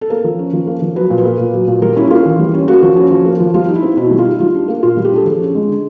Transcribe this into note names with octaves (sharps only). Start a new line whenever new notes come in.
A4
A#3 A#4
F3
C#4
F3
A#3
F3
F#3 B4
A#2
B4
A#3
A#2
F#3
A#2
G3 A#4
C#4 E4
A#3 F4
E3
G3
C#4
A#3 F#4
F3
C#4
F3
A#3
F3
G3 F4
D#4
E4
C4
B2 E4
G3
F4
D#4
G3 F4
D4
A#3
A#2 F4
G3
G4
D4 A4
F3 G#4
C#4
G#3
D3